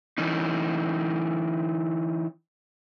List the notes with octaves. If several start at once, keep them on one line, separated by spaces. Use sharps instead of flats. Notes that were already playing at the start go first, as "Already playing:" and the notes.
E3 C#4 D#4